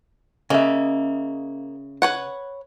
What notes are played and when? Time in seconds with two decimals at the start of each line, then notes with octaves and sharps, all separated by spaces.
0.50 C#3 A#3 D#5 E5
2.02 B4 C#5 F#5